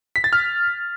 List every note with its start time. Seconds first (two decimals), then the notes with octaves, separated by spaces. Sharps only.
0.16 B6
0.24 A6
0.33 F6